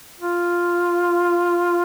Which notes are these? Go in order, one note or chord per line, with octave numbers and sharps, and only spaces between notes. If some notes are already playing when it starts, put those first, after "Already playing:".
F4